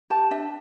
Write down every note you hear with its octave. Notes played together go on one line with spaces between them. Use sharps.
G4 A5
D4 E5